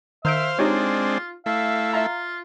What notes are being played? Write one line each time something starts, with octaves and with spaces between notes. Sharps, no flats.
D#3 C5 E5 F5 G6 D7
G#3 C4 D4 D#4 F4 G4 C#5
A3 E4 F5
F4 E5 F5 A#5